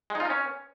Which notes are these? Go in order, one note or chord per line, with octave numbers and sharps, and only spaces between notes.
G#3
D#4
F4
D#4
C#4